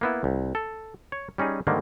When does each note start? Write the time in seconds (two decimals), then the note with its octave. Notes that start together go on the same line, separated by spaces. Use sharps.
0.01 A#3 B3 E4
0.24 C2
0.55 A4
1.12 C#5
1.38 G3 C#4 D#4 G#4
1.67 G#2 D3 D#3 G3 A#3